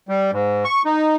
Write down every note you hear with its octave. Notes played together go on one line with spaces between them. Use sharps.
G3
G#2
C#6
D#4